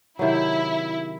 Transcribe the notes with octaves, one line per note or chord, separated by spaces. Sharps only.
C3 D#3 F#3 E4